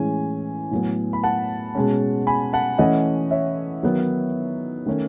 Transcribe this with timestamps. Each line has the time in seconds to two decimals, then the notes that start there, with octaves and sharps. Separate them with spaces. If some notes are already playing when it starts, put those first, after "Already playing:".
Already playing: A2 E3 G#3 C#4 G#5
0.71 A2 F#3 B3
1.13 B5
1.23 F#5 A5
1.75 B2 G#3 C#4
2.27 G#5 B5
2.53 F#5 A5
2.78 E3 A3 C#4 D#5 F#5
3.31 C#5 E5
3.83 D#3 F#3 B3
4.86 D#3 A3 C#4